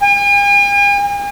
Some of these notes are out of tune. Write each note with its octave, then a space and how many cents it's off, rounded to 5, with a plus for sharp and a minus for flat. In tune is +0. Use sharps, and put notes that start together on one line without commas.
G#5 -45